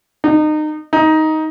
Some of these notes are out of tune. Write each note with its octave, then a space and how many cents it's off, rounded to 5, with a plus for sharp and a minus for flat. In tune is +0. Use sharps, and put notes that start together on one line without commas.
D#4 -30
D#4 +10